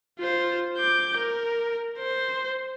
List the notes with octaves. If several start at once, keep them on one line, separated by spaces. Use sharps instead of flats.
F4 C5
D6 G6
A#4
C5